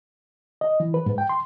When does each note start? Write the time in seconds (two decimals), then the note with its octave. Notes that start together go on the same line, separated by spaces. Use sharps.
0.61 D#5
0.80 E3
0.94 B4
1.06 G#2
1.18 G5
1.29 C6